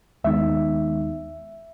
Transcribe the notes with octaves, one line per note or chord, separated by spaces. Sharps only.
D#2 D#3 G#3 B3 D#4 E5